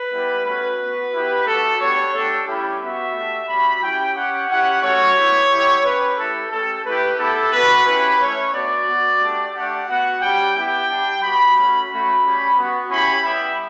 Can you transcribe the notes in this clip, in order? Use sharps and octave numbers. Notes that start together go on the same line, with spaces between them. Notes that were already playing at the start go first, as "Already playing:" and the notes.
Already playing: B4
G3 B3 E4 G4
A3 C#4 F#4 B4
B3 F#4
B3 E4 G4
A3 D4 F#4 A4
B3 D4 G4 C#5
A3 D4 G4 A4
G3 C#4 E4 G4
B3 F#4 E5
A3 D4 G4
G3 C#4 F#4 B5
C#4 E4 G4 G5
C#4 G4 F#5
C#4 E4 G4 F#5
A3 C#4 F#4 C#5
B3 E4 G4
G3 B3 E4 G4
C#4 G4 B4
A3 E4 G4 A4
A3 C#4 G4 A4
A3 E4 G4 B4
B3 E4 G4 A4
B3 D4 F#4 B4
C#4 E4 G4 B4
A3 C#4 E4 C#5
B3 D4 F#4 D5
B3 F#4
A3 D4 G4
A3 D4 G4 F#5
B3 F#4 F#5
G3 C#4 G4 G5
B3 E4 G4 G5
G3 D4 G4
G3 B3 F#4 B5
A3 C#4 F#4
A3 C#4 F#4 B5
G3 C#4 G4
B3 F#4
C#4 E4 G4 B5
G3 B3 E4 G4 E5